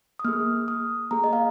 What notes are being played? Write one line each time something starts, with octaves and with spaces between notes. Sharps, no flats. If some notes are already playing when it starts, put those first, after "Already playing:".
D#6
A#3 G#4 F6
D#6
A#3 G#4 A#5
D#5
F5